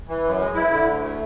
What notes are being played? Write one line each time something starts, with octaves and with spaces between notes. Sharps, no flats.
E3
F#2
G#3
E4
D3
D2
A3